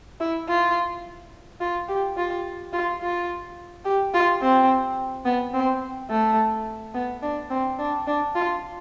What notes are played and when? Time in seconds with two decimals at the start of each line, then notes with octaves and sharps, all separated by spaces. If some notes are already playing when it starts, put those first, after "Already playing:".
0.20 E4
0.49 F4
1.61 F4
1.88 G4
2.17 F4
2.73 F4
3.01 F4
3.85 G4
4.14 F4
4.41 C4
5.25 B3
5.54 C4
6.10 A3
6.94 B3
7.23 D4
7.50 C4
7.79 D4
8.07 D4
8.35 F4